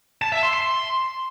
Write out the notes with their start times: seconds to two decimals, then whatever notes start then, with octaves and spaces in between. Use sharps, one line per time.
0.22 A5
0.32 E5
0.43 C6
0.53 C6